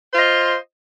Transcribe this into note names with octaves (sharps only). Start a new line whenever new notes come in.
F4 C5 D#5